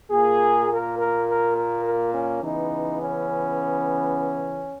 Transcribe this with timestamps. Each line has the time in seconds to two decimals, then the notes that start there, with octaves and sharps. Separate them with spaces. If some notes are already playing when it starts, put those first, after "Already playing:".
0.11 A#2 A#3 G#4
0.69 A#4
0.97 A#4
1.27 A#4
1.55 A#4
1.84 A#4
2.13 C#4
2.42 C#3 E3 B3 D#4
3.00 C#4